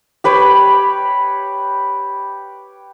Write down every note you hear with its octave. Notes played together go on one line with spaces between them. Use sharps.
G4 B4 C#5 B5